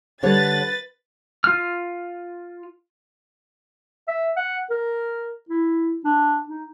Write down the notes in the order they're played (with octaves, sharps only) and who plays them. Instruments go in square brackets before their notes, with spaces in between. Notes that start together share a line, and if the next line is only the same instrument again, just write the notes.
[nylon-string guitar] D3 G3 C#5 [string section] B4 A6
[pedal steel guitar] F4 F6
[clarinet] E5
F#5
A#4
E4
D4
D#4